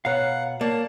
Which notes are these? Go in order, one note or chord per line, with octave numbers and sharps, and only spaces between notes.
B2 C#5 F5 F#5 A#5 F#6
A#3 C#5 D5 A5